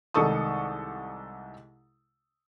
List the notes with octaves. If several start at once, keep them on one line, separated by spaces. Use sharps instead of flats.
C2 D#3 G#3 A4 C#6 D#6